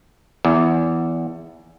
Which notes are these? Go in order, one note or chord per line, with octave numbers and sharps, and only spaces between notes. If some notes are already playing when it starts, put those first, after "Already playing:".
E2